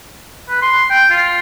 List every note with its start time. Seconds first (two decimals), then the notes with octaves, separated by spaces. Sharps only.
0.49 B4
0.62 C6
0.90 G5
1.10 F4